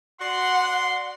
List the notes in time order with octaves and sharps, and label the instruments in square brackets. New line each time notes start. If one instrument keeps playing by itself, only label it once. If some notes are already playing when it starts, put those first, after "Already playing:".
[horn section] F#4 D5 C6 [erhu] F#5